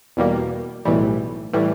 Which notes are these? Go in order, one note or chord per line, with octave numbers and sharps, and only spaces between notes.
E2 B2 G3 A#3
B1 A2 E3 G3
A2 E3 G3